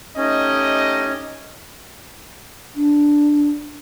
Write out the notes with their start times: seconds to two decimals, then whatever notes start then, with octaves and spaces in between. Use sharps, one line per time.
0.17 A3 C#4 D#4 G4 D#5
2.76 D4